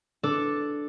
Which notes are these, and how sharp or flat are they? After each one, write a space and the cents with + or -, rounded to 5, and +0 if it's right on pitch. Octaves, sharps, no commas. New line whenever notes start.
D4 +0 A4 +0